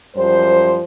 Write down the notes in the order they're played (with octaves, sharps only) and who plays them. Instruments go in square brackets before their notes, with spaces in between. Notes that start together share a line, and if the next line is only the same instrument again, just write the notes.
[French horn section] F#2 F3 G3 C5